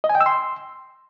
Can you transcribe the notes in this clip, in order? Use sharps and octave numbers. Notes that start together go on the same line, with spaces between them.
D#5
G#5
G5
E6
C6